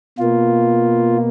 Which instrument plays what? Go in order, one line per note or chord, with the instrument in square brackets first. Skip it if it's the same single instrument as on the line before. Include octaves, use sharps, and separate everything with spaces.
[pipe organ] B2 A#3 F4